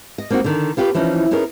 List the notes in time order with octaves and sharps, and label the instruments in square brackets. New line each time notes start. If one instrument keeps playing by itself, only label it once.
[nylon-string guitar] D#5
A#3 C4 D#4 F4 F#4
D3 D#3
B3 F4 G4 B4 C#5
E3 F3 C#4 D#4
B3 C#4 D#4 G#4 A#4